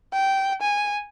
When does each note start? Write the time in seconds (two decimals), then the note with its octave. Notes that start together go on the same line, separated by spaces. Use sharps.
0.13 G5
0.62 G#5